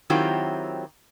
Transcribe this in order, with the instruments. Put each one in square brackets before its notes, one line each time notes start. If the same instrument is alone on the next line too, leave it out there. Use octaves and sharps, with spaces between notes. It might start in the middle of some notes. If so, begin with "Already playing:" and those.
[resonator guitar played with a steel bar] D#3 F#3 C4 E4 F4 G4